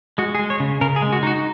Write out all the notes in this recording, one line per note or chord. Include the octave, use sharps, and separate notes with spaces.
G#3 F#4
G#4
G#3
C#5
C#3
C#3 A#4
G#4
G#3
F#4
D#4 F#4